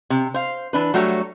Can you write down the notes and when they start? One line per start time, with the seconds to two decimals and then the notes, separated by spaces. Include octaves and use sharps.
0.10 C3
0.34 C5 F5
0.73 E3 D4 B4
0.94 F#3 G3 A3 F#4 C#5